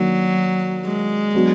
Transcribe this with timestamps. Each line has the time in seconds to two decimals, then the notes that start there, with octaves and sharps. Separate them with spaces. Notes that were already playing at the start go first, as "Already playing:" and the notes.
Already playing: D#3 F#3 A#3 D4 F#4
0.86 G#3
1.35 F#3 B3 D4 F#4